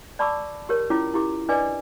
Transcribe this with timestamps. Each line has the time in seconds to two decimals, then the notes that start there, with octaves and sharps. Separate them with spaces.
0.19 D5 A5 B5 C#6 D6 E6
0.69 G4 A#4 C#5
0.90 C#4 E4 F4 C#5 D6
1.14 E4 G4 D6
1.49 D4 B4 D5 D#5 G#5 D6